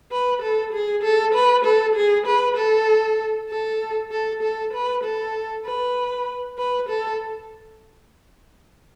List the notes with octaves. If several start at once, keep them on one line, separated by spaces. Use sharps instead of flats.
B4
A4
G#4
A4
B4
A4
G#4
B4
A4
A4
A4
A4
B4
A4
B4
B4
A4